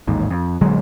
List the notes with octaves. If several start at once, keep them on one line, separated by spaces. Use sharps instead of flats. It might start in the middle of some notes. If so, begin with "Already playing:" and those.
A1 D#2 G#2
F2
A#1 D3 F#3 G#3